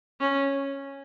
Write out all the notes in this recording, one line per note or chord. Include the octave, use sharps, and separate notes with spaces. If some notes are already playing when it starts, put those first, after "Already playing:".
C#4